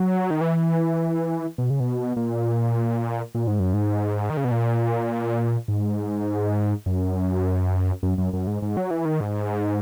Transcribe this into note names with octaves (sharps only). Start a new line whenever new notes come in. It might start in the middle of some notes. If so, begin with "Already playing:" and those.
Already playing: F#3
D#3
E3
B2
C#3
B2
A#2
A#2
G#2
F#2
G#2
D#3
C#3
B2
A#2
G#2
F#2
F#2
F#2
F#2
G#2
G#2
F#3
E3
D#3
G#2